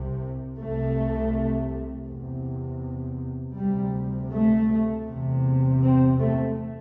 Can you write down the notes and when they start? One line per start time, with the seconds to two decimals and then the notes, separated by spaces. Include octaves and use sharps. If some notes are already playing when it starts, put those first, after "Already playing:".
Already playing: C2 C3
0.57 C2 C3 A3
2.06 E2 C3
3.57 D2 C3 G3
4.32 A3
5.08 E2 C3
5.82 C4
6.20 A3